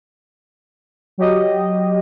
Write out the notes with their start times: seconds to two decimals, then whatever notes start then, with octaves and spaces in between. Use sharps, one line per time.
1.18 F#3 G4 D#5